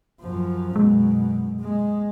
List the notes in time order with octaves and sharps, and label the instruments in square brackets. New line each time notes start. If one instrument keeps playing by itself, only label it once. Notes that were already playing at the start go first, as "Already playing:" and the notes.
[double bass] F#2 F3
[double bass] F#2 B2 [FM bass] G#3
[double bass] G#3